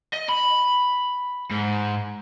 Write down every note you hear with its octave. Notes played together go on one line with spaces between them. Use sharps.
D#5
B5
G#2